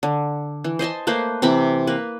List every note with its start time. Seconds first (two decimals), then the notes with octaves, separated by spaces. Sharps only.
0.03 D3
0.64 E3
0.79 C5 D#5 G#5 A5
1.07 A3 A#3 B4 C5
1.42 C3 E3 C4 B5
1.87 A#3 B4